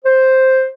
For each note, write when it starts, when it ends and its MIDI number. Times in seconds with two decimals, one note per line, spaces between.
0.05 0.67 72